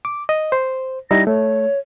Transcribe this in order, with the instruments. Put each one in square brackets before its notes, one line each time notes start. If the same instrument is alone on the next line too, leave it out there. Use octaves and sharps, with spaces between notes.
[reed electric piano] D6
D#5
C5
[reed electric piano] G3 D#4 E4 [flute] A#6
[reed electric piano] A3 [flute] C#5